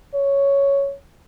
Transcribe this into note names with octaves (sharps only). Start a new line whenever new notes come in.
C#5